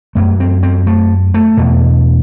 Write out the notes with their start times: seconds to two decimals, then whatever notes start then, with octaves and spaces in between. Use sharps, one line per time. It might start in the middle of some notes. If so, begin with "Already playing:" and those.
0.15 F#2 A3
0.40 C4
0.63 C4
0.87 A3
1.34 A3
1.57 E2 B2